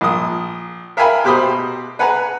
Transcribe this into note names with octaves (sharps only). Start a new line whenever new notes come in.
A#1 D#6
A#4 E5 F5 G5 G#5 B5
B2 G4 C5 B5 D#6
B4 F#5 G#5 A#5